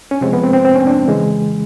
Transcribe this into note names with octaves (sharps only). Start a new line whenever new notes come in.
C#4
C3 F3 G#3 C4
B3
C4
C4
C4
C#4
D4
C#3 E3 G#3